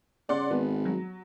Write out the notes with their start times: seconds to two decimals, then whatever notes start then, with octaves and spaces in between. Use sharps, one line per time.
0.29 C#3 D5 F#5 C6
0.51 G#1 B3
0.85 F#3